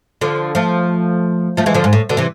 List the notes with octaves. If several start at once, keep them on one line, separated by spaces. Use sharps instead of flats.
D3 F3
F3 A3
F3 A3
E3 G#3
D3 F3
G#2
A2
B2 D3
C3 E3